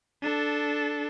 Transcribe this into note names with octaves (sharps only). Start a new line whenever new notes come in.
D4 A4